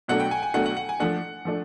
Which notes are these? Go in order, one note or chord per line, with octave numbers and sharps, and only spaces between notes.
B2 F#3 A3 D4 F#5
G5
G#5
G#5
B2 F#3 A3 D4 F#5
F#5
F#5
G#5
F3 A3 D4 F#5
F3 A3 D4